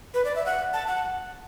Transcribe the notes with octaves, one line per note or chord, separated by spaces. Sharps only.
B4
D5
E5
F#5
A5
F#5